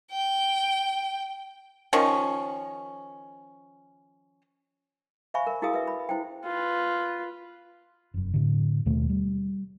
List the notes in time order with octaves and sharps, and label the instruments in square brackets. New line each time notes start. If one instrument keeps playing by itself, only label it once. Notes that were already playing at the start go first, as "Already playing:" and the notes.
[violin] G5
[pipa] D#3 F3 C#4
[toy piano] C5 E5 F5 G#5 B5 C#6
A#4
E4 F#4 G#4 A#4 F5 D#6
B4 E5
B5
E4 C5 G5
[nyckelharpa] F4 B4
[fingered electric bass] F1 F#2
A2 D3
D#2 B2 D#3 A3
G3